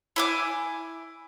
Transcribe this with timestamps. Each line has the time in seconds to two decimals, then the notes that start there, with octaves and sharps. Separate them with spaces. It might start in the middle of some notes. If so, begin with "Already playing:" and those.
0.16 E4 G#5 D6